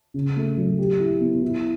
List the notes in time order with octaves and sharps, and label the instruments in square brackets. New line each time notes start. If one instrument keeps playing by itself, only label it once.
[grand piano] C#3
A3
F#3
G4
E4
B3
E4